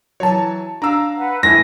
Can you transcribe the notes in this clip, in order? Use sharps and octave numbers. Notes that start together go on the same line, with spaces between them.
E3 F#3 C#5 A5
D4 F5 A#5 E6
B4 F#5
A2 E3 A3 E4 G#5 A#6